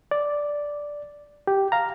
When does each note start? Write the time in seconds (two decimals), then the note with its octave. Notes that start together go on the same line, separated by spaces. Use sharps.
0.11 D5
1.47 G4
1.72 F5 A#5